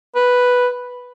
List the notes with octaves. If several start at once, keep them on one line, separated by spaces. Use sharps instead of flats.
B4